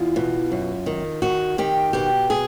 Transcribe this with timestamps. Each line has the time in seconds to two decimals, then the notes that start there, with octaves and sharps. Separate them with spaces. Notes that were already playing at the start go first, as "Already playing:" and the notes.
Already playing: E2 F4
0.16 B2
0.52 F#2
0.86 D#3
1.22 D#3 F#4
1.58 D#3 G4
1.93 B2 G4
2.30 G#4